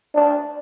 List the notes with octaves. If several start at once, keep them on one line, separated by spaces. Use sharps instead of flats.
D4